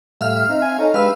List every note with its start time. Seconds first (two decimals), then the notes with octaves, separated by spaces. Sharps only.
0.21 A2 G3 E5 F5 F6
0.49 C4 D#4
0.62 G#5
0.79 D#4 A4 C#5
0.94 G#3 D4 G4 B4 F5 E6